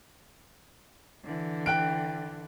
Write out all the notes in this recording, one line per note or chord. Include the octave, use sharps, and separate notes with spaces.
D3 E3
G5 F#6 D7